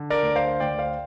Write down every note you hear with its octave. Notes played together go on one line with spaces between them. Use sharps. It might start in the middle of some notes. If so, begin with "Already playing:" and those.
Already playing: D3
A#4 D5
D2
C5 F5
D2 D5 G5
C5 F5